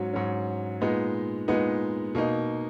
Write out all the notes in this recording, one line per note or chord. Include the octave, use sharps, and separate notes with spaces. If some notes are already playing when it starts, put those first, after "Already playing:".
Already playing: G#2 F#3 C#4
G#2 F#3 C#4
A#2 G#3 B3 D#4
A#2 G#3 B3 D#4
B2 A#3 D#4